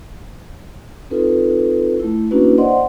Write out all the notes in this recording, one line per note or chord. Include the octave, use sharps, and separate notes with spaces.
C4 D#4 F4 A4 B4
A3 E4
A#3 C#4 D4 E4 F#4 B4
C5 D5 D#5 F#5 C6